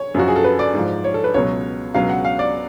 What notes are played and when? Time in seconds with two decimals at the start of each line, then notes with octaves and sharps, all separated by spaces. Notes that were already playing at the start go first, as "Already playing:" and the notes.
Already playing: C#5
0.15 F#2 F3 F#4
0.28 G#4
0.36 A4
0.44 B4
0.59 D5
0.74 G#2 F3
1.04 C#5
1.14 A4
1.24 B4
1.34 C#2 B2 F#3 C#5
1.94 C#2 B2 F#3 F5
2.09 F#5
2.25 F5
2.39 D5